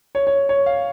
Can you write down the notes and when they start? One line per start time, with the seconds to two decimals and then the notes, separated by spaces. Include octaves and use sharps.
0.15 C#5
0.27 C#5
0.49 C#5
0.66 F5